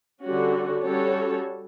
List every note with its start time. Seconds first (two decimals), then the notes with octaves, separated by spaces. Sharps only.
0.24 D3 G3 C#4 F#4
0.85 G3 C#4 F#4 A4 C#5